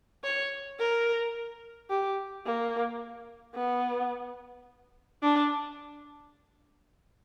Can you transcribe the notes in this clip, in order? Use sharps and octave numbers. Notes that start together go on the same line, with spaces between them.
C#5
A#4
G4
A#3
B3
D4